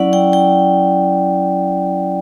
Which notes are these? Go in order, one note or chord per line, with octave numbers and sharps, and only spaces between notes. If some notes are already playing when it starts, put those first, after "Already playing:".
Already playing: F#3 C#4 E4 D5 F#5
G5
G5